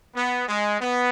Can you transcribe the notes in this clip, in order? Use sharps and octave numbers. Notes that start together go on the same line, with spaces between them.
B3
G#3
B3